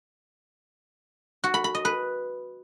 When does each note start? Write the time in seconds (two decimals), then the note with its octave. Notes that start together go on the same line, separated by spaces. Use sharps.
1.44 F#4
1.54 B5
1.64 B5
1.75 D#5
1.85 B4